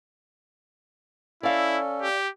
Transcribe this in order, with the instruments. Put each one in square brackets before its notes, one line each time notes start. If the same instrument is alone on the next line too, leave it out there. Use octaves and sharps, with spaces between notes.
[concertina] C#4 A4 [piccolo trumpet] E4 [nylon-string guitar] D5 F5
[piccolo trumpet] G4